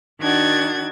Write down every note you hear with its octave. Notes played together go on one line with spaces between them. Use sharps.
D#3 D4 F#4 F#5 G#6 A6